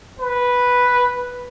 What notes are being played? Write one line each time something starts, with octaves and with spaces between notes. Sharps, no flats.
B4